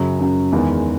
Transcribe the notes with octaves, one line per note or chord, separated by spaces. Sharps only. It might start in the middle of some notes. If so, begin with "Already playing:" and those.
Already playing: F#2 C#3 F#3
F#2 C#3 F#3
E2 D#3 G#3